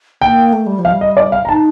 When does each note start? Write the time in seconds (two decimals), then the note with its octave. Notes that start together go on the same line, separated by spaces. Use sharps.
0.21 A#3 G5
0.53 A3
0.67 G3
0.79 F3
0.85 F5
0.91 G3
1.01 D#5
1.17 D5
1.32 F5
1.45 A#5
1.48 D#4 A5